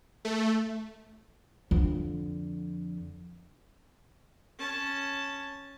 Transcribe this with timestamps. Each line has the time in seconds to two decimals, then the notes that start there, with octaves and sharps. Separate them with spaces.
0.25 A3
1.71 F2 D3
4.58 C#4 A5